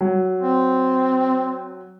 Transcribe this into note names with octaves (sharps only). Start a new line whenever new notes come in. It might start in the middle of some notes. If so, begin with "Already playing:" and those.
F#3
C4